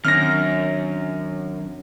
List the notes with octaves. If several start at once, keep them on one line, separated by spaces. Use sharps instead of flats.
F#2 D#3 C4 D4 F6 A#6